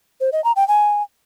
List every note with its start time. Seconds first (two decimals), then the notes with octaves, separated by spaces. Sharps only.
0.21 C5
0.32 D#5
0.44 A#5
0.56 G5
0.68 G#5